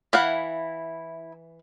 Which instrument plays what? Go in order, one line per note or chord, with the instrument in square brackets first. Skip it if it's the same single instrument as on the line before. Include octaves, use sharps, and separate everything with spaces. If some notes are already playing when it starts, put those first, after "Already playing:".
[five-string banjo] E3 F5 F#5 [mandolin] E4